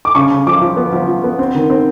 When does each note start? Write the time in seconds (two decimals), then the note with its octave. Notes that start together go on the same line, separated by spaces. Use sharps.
0.05 D6
0.15 C#3 C#6
0.31 C#3
0.47 F3 D6
0.61 F3
0.77 B3
0.92 F3
1.08 F3
1.24 B3
1.39 C4
1.55 D#3
1.70 C4